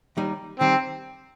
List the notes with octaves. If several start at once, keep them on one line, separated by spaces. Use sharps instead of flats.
D#2 D#3 G3 D#4
D#3 G3 C4